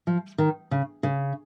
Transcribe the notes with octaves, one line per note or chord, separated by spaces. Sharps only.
F3
D#3
C#3
C#3